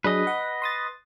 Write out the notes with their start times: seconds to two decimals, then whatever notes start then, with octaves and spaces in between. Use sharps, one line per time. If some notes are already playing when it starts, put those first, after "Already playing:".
0.04 F#3 D4 G#4 B4 D#5
0.27 F#5
0.62 C6 D#6 A6